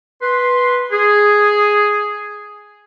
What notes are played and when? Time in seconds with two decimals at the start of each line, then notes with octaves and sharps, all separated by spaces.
0.22 B4 C6
0.91 G#4